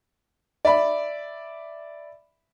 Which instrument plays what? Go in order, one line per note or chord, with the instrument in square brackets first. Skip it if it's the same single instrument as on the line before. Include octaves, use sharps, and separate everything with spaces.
[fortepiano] D5 E5 B5